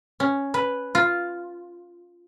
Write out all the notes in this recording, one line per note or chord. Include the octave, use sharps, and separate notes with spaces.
C#4
B4
F4